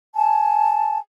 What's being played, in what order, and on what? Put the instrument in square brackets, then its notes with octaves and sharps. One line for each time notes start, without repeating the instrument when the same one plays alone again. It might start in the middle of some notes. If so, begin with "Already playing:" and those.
[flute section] G#5 A5